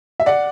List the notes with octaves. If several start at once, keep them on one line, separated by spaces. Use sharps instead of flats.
E5
D5 F#5